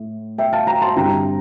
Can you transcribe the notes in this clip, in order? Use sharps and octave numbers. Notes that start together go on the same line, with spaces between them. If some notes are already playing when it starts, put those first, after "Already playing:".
Already playing: A2
E5 G5
F5 A5
G5 A#5
A5 C6
G2 D3 G3 C4 E4 G5 A#5